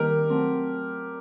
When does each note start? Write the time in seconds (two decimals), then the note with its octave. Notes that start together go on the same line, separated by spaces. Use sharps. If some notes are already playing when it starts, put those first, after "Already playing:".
Already playing: D#3 G3 A#3 G4 A#4
0.30 F#3 A3 C4